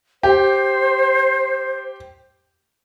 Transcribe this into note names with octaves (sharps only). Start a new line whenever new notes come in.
G4 C5